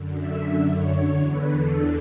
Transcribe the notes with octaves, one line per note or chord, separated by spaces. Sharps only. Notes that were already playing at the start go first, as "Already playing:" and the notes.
Already playing: F#2 D3
E5
C#5
E2 D3
B4
A4